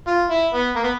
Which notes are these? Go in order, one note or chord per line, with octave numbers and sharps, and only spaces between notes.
F4
E4
B3
A#3
B3